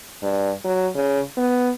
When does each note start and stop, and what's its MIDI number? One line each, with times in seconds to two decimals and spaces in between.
0.23 0.52 43
0.65 0.88 54
0.95 1.20 49
1.37 1.71 59